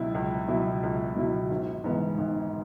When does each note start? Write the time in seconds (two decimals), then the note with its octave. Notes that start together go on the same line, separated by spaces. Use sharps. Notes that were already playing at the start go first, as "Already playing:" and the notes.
Already playing: C#2 B2 F#3 E4
0.15 C#2
0.49 B2 F#3 E4
0.83 C#2
1.16 B2 F#3 E4
1.50 G#1
1.84 G#2 E3 B3
2.18 G#1